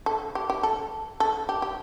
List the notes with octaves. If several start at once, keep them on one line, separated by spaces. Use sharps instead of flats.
A4
G4
G4
A4
A4
G4
G4